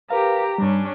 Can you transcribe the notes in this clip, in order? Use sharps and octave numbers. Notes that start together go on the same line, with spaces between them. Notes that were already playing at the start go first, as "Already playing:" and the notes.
G4 A#4 B4 F5 A#5
G2 G3 C#4 D4